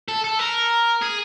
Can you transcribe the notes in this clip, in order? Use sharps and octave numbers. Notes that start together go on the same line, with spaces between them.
A4
A4
A#4
G#4